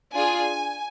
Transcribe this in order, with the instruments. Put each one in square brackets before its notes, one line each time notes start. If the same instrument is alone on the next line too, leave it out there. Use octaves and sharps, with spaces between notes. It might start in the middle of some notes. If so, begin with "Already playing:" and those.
[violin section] D4 F4 G#4 G#5